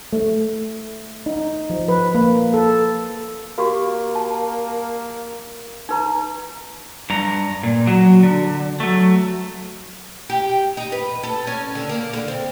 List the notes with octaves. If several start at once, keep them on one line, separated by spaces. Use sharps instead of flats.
A3
D#4
F3
B4
A#3
A4
A#3 F#4 G4
A5
D#4 B4 A#5
G2 A#5
A#2
F#3
D3
F#3 A3
G4
D#4
B4
A4
C#4
D3
A#3
D3
C4